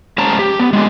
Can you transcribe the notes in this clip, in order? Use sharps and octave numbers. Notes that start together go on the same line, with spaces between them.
G#2 C#4 A5 A#5
G4
B3
D3 G#3